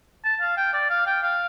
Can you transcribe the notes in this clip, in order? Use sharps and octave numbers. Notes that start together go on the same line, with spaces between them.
A5
F5
G5
D5
F5
G5
F5